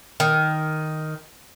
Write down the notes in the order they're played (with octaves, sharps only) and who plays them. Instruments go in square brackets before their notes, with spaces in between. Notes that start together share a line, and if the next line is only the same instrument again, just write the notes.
[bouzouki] D#3